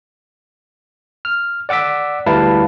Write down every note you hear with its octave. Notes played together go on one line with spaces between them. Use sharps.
F6
D5 F#5 D6 E6 B6
D2 G3 E4 B4 F5 A5